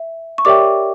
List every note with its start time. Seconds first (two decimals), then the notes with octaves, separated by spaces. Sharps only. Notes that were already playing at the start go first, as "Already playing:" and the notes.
Already playing: E5
0.38 C#6
0.45 G4 A#4 C#5 D5 E5 G5 D6